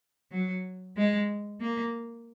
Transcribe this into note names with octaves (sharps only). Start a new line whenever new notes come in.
F#3
G#3
A#3